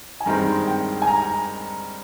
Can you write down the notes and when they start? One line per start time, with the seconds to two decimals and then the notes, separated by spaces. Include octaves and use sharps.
0.20 G#5
0.26 G2 D#3 G#3 C4 A#5
0.67 G5
1.02 G#5
1.07 A#5